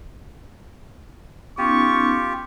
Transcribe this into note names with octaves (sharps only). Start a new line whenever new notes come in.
B3 C#4 D#4 F4 G4 C#6